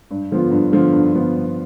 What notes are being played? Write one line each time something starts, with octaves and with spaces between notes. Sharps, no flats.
G2
D3 F3 B3 F4
G2
D3 F3 B3 F4
G2
D3 F3 B3 F4
G2